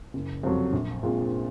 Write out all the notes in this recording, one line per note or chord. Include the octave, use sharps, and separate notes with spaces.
F#1
F2 C3 F#3
A#1
A#2 G#3 C4 F4